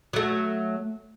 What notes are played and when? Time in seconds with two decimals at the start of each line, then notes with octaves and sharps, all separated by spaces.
0.13 F#3 A3